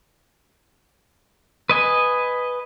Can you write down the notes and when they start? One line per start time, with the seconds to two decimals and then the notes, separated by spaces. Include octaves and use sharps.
1.70 B4 D#5 G#5